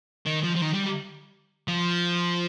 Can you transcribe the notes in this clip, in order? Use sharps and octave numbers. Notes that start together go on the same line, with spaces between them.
D#3
F3
F3
D#3
G3
F3